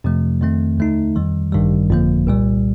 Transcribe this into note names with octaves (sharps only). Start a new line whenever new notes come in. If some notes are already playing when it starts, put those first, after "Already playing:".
F2 C3 F3 A3
F2 D#3 A3 C4
D#2 D3 A3 D#4
F2 D#3 G3
A1 G2 D#3 G3
G1 F2 D3 F3 A#3
C2 A#2 G3